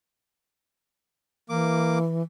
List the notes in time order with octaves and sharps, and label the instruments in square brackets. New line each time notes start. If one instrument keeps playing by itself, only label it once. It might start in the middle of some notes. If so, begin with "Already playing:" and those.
[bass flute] E3 [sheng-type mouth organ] A#3 D6